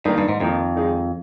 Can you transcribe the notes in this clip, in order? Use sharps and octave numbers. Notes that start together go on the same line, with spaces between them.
G2 D#3 A#3 D#4
G2
G#2
F2 D#3 A#3 D#4
D#3 G#3 D#4 G#4